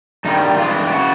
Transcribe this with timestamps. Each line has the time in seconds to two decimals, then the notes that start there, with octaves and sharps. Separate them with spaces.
0.25 G2 D#3 G3 D#4
0.58 G2 E3 G#3 F4
0.87 G4
0.92 C#3 E3 F#4